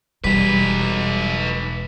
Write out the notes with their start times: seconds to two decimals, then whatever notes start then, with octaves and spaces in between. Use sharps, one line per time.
0.24 E1 G3 D#4 B4 B6